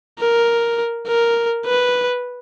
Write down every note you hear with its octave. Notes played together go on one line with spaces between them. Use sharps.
A#4
A#4
B4